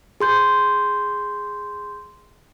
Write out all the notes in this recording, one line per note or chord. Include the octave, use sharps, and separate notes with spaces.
G#4 C6 G6